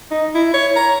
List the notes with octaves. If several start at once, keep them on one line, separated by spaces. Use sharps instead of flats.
D#4
E4
C#5
A#5